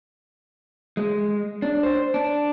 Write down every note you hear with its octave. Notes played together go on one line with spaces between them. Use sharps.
G#3
D4
C5
D4